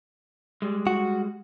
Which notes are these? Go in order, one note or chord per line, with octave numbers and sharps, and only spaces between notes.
G3 G#3
F#4